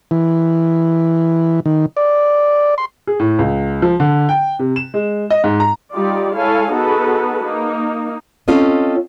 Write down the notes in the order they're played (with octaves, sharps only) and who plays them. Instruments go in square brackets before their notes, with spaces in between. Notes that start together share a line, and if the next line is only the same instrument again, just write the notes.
[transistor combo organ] E3
D#3
D5
C6
[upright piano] G#4
A2
C#2
F3
D3
G5
C3
E7
G#3
D#5
G#2
A#5
[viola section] G3 D#4 F4 G4 D5
G#3 E4 A4 C#5 F5 G#5
B3 D#4 F#4 G#4 A4 B4
A#3 D#4
[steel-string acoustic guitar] C4 C#4 F4 A4 D#5